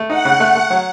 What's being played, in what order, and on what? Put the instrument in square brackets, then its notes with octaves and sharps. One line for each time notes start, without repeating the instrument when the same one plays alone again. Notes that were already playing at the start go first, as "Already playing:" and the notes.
Already playing: [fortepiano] A3
[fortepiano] D#4 [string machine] F#5
[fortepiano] C#3
[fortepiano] A3 [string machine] F#5
[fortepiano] A3
F#3